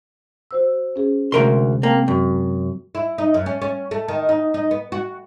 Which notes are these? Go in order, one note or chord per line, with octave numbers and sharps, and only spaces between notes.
F#4 C5 E6
C#4 G#4
D2 C3 G#3 A#4 C6
A#3 C4 G5 A5
F#2
E4
D#4
F#2
C#4
C#4
A3
D#3
D#4
D#4
B3
F#4